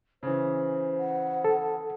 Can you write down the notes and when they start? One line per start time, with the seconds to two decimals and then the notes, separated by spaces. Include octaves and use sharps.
0.23 C#3 E3 C5
0.99 F#5
1.44 A4